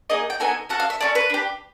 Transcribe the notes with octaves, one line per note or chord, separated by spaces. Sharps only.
A#3 D#4 G#4 D#5
G5
B3 D#4 F#4 A4 G#5
C#4 F#4 A4 F#5
F5
E5
C#4 F#4 A4 D5
B4
D4 G4